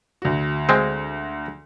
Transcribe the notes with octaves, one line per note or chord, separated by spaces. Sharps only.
D2 F#4
G#3 C4